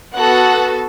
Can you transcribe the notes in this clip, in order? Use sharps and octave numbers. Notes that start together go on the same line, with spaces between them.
B3 F#4 A4 F#5